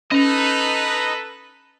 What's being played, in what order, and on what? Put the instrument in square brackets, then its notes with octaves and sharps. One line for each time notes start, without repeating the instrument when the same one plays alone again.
[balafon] C#4 [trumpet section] A4 B4 [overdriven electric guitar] D#5 A#5